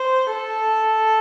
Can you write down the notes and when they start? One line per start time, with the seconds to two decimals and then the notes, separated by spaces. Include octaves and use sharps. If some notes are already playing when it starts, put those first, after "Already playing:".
Already playing: C5
0.33 A4